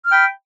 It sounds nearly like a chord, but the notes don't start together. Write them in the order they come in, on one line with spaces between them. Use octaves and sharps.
F6 G5 B5